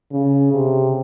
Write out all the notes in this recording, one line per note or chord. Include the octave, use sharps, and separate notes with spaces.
C#3
C3